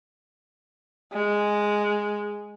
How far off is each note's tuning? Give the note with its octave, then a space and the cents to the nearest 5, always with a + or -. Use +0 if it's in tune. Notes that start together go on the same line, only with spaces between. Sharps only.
G#3 -5